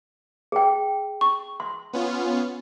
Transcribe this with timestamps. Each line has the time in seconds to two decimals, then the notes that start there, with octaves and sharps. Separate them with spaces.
0.52 G#4 G5
1.21 C#6
1.60 C6
1.93 B3 C#4 F4